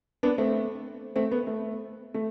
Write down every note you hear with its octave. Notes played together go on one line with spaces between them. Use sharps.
B3 D4
A3 C4
A3 C4
B3
A3
A3